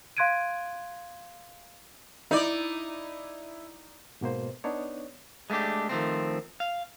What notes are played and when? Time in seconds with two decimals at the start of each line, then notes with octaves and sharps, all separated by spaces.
0.17 F5 C6 F#6 G#6 D7 D#7
2.31 D#4 E4 D5
4.21 G#2 B2 A#3 C5
4.64 B3 D4 D#4 C#5
5.50 G#3 A3 B3 D4 G4
5.89 D#3 F3 A3 C4
6.60 F5